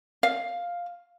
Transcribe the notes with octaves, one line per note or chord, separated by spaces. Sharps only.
F5